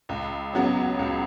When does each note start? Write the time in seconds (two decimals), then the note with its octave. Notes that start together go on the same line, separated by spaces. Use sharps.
0.09 C#2
0.53 C#3 F#3 B3
0.99 C#2